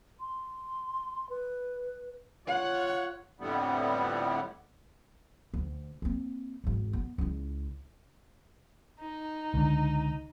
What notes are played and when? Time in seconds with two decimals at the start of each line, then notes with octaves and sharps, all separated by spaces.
0.20 C6
1.30 B4
2.47 F4 C#5 F#5
3.40 F2 A2 D3 G3 B3
5.54 D2
6.02 A#3 C4
6.64 G#1 E2
6.93 B3
7.18 C#2 E4
9.01 D#4
9.54 C#2 D3